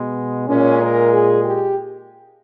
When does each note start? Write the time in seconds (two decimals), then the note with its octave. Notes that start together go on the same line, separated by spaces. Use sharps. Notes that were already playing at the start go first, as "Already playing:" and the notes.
Already playing: B2 G#3 B3
0.47 A#2 G#3 C#4
0.79 A#4
1.10 G#4
1.41 G4